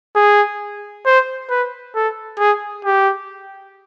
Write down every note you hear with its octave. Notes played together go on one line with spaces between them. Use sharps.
G#4
C5
B4
A4
G#4
G4